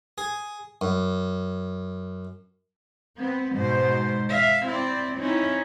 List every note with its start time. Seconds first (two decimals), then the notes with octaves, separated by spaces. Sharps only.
0.18 G#4
0.81 F#2
3.18 B3 C4
3.54 G#2 B2 C5
4.30 E5 F5
4.66 C4 E4 D5
5.18 C4 C#4 D#4 E4